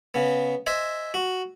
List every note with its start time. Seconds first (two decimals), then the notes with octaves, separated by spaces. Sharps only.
0.14 C#3 B3
0.66 C5 D#5 E5 G#5
1.14 F#4